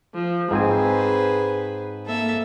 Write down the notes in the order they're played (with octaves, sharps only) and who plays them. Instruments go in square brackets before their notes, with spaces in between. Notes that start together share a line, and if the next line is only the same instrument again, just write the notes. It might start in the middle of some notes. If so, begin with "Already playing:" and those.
[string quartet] F3
[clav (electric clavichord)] G#2 C4 G#5 [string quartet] G#4 B4 C5
[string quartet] A#3 A4 E5